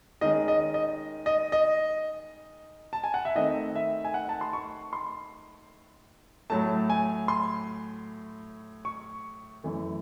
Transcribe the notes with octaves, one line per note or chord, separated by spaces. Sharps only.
D#3 G#3 C#4 D#5
D#5
D#5
D#5
D#5
A5
G#5
F#5
E5
D#3 A3 C4 D#5
E5
G#5
F#5
A5
C6
C#6
C6
A2 F#3 A3 A5
G#5
C6
C#6
F#2 E3 A3